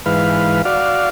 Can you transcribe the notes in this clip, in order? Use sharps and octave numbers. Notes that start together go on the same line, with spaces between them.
G#2 E3 B4 F5
F#4 D5 F5